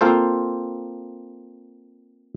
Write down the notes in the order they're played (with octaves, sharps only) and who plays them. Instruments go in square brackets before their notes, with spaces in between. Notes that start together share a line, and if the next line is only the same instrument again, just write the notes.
[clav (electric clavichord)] A#3 C4 F4 A4 C5